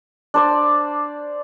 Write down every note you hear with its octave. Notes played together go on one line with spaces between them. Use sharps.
D4 C5 D5